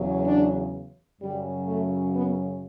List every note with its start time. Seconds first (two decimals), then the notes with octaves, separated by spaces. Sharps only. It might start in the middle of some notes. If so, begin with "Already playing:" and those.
Already playing: E2 C#3 F#3
0.27 D4
1.21 F#2 C#3 F#3 G3
1.68 A3
2.16 B3